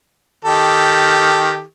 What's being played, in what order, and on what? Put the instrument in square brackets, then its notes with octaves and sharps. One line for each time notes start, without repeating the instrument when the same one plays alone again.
[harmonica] D#3 G4 A4